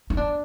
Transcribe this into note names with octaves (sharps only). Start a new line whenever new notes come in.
D#4
D4